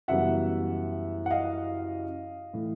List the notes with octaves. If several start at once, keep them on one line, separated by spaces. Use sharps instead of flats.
F#2 C#3 E3 G3 B3 E5 F#5
F#5
D#5 F5
A2 E3